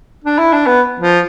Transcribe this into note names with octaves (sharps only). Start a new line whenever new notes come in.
D4
E4
D4
B3
F3